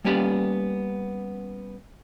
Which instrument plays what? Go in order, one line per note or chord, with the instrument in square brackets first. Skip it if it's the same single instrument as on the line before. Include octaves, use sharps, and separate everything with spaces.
[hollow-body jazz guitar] G3 A#3 B3 C#4 G4 D5